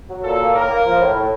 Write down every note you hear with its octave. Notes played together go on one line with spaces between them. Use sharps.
F#3
A#2 A4
A#3
A2 A#4
A#3
F3
A2
A2